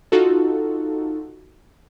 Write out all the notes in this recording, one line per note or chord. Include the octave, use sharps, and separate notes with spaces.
D#4 F4 F#4 A4